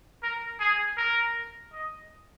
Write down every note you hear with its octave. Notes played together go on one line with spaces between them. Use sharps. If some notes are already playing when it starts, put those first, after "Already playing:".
A#4
G#4
A#4
D#5